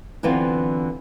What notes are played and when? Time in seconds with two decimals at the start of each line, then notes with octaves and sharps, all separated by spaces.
0.23 D3 E3 F#3 B3 C4 F4